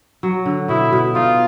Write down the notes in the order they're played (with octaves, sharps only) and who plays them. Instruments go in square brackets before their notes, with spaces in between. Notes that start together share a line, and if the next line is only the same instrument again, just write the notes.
[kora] F#3
D3
[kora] B2 [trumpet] E4
[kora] B2
[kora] D#4 [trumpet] F4